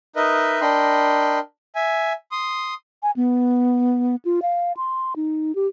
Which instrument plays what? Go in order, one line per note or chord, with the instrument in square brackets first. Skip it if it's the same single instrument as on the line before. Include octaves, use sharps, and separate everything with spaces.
[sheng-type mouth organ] D#4 A#4 B4 D#5 E5
D4 A#4 D#5 G5 B5 C6
E5 G#5
C6 D#6
[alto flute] G#5
B3
F4
F5
C6
D#4
G4